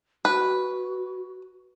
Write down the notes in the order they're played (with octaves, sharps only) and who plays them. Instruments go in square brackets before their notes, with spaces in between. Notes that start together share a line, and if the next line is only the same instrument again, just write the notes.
[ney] F#4 [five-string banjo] B4